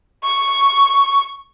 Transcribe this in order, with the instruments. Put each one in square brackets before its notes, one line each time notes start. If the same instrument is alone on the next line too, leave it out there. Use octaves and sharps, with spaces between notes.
[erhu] C#6